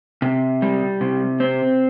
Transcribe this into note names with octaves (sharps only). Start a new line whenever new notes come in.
C3
G3
C3
C4